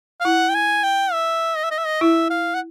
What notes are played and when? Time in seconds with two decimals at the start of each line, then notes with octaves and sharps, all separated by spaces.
0.20 F5
0.25 E4 F#5
0.49 G5
0.55 G#5
0.83 G5
1.12 E5
1.57 D#5
1.64 E5
1.71 D#5
1.78 E5
1.85 D#5
2.01 E4 E5
2.30 F5
2.54 F#5